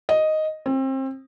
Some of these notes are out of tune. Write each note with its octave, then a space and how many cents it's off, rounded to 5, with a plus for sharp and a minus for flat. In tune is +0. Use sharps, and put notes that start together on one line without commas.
D#5 +0
C4 +30